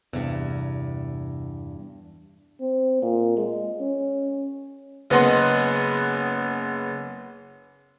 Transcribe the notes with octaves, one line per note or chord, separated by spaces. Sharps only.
E2 G2 C3
C4
A#2
G#3
C#4
F#1 B3 B4 D#5 F#5 C6